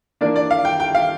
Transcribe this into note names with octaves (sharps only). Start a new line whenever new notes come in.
E3 A#3 D4 D5
D5
F5
G5
G5
F5